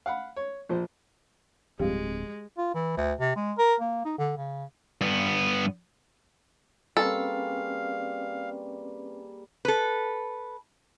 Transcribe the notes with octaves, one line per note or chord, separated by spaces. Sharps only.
F5 F#5 B5
C#5
A#1 F3 C5
D1 G2 F3 G3 G#3 C4 G4 F5
F4
E3
D2
C3
G#3
A#4
A#3
D#4
D3
C#3
G2 B3
G3 A#3 C4 C#4 G#4 A4 B4 F5
A4 B4